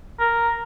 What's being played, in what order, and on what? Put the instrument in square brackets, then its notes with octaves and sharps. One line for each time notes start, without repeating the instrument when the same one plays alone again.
[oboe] A#4